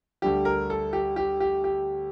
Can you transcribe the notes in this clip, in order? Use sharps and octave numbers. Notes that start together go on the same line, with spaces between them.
D2 D3 G3 G4
A#4
A4
G4
G4
G4
G4